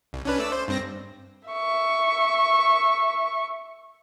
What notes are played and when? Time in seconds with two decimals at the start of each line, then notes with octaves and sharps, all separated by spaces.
0.13 C2
0.25 C#4 D4 B4
0.39 A3 D5 E6
0.52 C5
0.68 G2 C4 A#6
1.48 E5 C#6